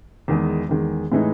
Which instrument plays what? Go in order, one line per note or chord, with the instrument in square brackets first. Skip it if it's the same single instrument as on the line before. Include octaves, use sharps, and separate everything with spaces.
[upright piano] E2 D#3 G#3
E2 D#3 G#3
A2 E3 G#3 D#4